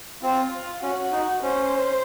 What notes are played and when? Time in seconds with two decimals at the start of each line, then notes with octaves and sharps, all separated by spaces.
0.23 C4 F4
0.82 C#4 F#4
1.12 D#4
1.43 C#4 C5